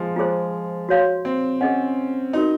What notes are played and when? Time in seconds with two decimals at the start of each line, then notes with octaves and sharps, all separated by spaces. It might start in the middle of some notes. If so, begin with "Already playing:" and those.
Already playing: F3 G#3
0.16 G#3 F4 G#4 C5
0.89 F#4 C#5 F5 C6
1.25 C4
1.61 C#4 G#4 D#5 F#5
2.33 C#4 D#4 F#4 A#4